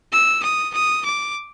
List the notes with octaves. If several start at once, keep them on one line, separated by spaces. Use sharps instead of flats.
E6
D#6
D#6
D6